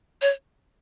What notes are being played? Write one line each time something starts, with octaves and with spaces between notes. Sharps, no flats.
C#5